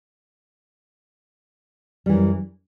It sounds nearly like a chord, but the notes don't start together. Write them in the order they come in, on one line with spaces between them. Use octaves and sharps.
G3 E3 F#2